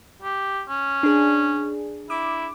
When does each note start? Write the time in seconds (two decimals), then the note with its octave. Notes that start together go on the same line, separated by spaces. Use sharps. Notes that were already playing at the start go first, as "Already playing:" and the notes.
0.22 G4
0.69 C#4
1.03 D4 G#4
2.10 E4 D6